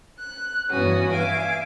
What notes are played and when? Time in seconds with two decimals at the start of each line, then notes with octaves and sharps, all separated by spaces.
0.20 F#6
0.70 G2 E3 B3 C#4 F#4 D#6
1.11 E5 F5 G#5 D6